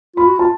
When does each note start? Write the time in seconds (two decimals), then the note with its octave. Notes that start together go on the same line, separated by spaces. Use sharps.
0.16 F4 B5
0.27 F#4
0.39 F4 A5